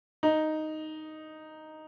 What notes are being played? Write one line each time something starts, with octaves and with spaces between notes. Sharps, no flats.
D#4